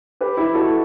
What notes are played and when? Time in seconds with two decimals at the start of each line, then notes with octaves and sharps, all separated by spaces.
0.21 G4 B4
0.37 E4 G4
0.54 F#4 A4